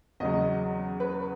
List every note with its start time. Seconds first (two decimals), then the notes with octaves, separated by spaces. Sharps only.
0.20 E2 C#3 F#3 D#5
1.00 B4